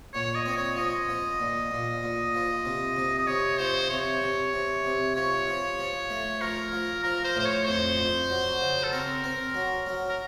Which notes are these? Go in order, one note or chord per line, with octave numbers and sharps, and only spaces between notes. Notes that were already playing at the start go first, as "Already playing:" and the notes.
A#2 C#5
D#5
C4
C#5
F3 D#5
F3
A#2
A#2
A#2
F3
C3
C3
D#5
C3 C#5
F3 C5
C3 C#5
C3
C3
C3
F3 C#5
F3
F3
A3
F3 A#4
F3
F3 A#4
C5
A2 C5
C#5
F2 C5
F2
F#3
C#3
A4
C4 A#4
C4
F#3
F#3
A#4